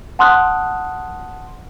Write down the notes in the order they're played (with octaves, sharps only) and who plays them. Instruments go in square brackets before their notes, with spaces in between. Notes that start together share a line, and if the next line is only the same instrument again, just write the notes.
[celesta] F#5 A5 C6 D#6 F6 F#6